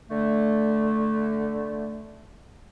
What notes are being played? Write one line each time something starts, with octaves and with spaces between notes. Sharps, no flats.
D3 A3